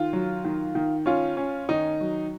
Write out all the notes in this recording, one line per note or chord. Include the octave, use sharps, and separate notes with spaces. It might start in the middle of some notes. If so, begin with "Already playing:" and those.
Already playing: D#3 F4
F#3
D#3
D#3
C#4 F4
C#4
D#3 D#4
F#3